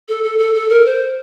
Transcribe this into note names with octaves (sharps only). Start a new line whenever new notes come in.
A4
A4
A4
A4
A#4
C5